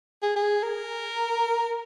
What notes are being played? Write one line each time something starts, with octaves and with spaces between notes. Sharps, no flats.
G#4
G#4
A#4